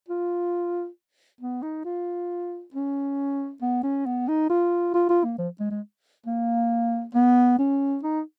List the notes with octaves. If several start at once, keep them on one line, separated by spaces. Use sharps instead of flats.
F4
B3
D#4
F4
C#4
B3
C#4
B3
D#4
F4
F4
F4
A#3
F3
G#3
G#3
A#3
B3
C#4
D#4